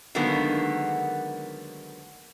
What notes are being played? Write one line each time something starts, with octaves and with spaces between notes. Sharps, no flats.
D3 D#3 F#3 G#3 A#3 B3